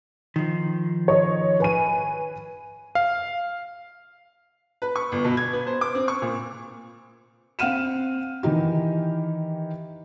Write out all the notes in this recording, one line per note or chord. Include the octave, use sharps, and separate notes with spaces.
D#3 F3
C#5 D#5
B4 G#5 D#7
F5
B4
C#6
G1
B2
G#6
B3
C5
D6
C4
C#6
A#2
C4 F5 F#5 F6 D#7 E7
D#3 E3 D#4 G4